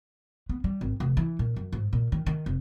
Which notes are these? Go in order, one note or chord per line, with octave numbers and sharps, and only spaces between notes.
B3
G3
G#1
F1
E3
A#2
F#2
G#2
A#2
D#3
D#3
F1